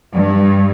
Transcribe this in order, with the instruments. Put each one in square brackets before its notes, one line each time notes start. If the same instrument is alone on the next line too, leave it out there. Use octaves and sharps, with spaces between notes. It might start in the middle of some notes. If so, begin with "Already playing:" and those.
[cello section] G2